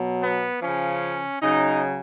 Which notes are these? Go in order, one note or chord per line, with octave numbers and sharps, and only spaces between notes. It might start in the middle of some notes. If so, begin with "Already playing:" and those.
Already playing: B2 F#3
B3
C#3 F3 C#4
C#3 F#3 D#4